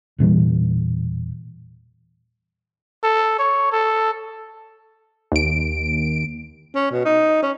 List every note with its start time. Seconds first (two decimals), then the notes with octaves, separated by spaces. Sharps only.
0.18 E1 A#2 E3 G3
3.03 A4
3.39 C#5
3.73 A4
5.32 D#2 D7
6.75 C#4
6.91 B2
7.05 D#4
7.43 C#4